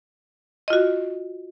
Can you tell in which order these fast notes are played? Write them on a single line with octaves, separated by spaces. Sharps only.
D#5 F4 F#4